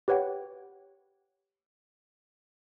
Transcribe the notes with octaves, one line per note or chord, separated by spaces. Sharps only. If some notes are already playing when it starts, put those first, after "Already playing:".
G4 B4 C#5 F#5 G5